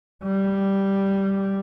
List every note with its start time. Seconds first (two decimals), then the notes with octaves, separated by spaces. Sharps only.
0.23 G3